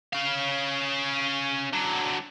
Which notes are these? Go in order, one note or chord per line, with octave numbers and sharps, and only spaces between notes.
C#4 F5
D3 F#3